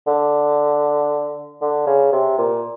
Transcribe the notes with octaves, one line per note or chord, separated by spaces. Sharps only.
D3
D3
C#3
C3
A#2